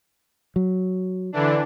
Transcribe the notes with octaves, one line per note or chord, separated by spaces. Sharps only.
F#3
D3 E3 D4